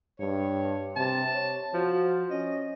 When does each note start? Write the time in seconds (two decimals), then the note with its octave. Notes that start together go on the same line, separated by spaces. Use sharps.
0.20 G2 C#5
0.96 C3 A5
1.34 C#5
1.74 F3 F#4
2.30 C#4 D#5